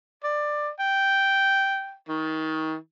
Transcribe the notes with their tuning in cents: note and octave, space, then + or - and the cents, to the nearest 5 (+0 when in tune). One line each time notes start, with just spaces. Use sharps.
D5 +15
G5 -5
D#3 +25